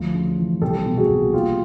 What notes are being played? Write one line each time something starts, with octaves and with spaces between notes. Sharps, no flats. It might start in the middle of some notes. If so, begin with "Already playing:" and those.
Already playing: D2 D3 F3
C#3
E3
C2 G4 A4
B2
F#4 G#4
C2
A#1 F4 G4